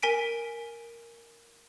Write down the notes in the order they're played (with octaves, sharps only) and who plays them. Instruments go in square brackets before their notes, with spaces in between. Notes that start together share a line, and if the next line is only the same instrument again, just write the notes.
[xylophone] A#4 G#5 B6 D7